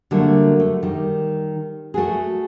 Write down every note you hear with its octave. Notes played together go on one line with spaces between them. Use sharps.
D3 F#3 G3 A3 A#3
A3
D#3 G3
A3 F#4 G#4